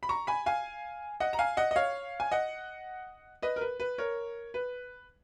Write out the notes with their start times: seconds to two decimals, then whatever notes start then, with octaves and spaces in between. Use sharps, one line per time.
0.03 B5
0.09 A#5 C#6
0.27 G#5 B5
0.46 F5 G#5
1.20 D#5 F#5
1.33 A#5
1.39 F5 G#5
1.57 D#5 F#5
1.71 D#5
1.76 C#5 F5
2.20 G#5
2.32 D#5 F#5
3.42 B4 D#5
3.56 A#4
3.61 B4
3.80 B4
3.98 A#4 C#5
4.54 B4